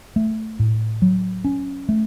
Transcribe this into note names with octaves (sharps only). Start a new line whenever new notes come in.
A3
A2
F#3
C#4
A3